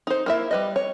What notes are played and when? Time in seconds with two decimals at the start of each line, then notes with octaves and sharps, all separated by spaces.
0.07 D#4 C5
0.26 A#3 E4 E5
0.51 G3 B4 D#5
0.76 C#5